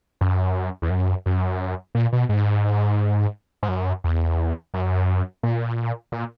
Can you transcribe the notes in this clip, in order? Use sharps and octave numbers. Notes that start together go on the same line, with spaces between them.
F#2
E2
F#2
F#2
A#2
B2
G#2
G#2
F#2
E2
F#2
A#2
A#2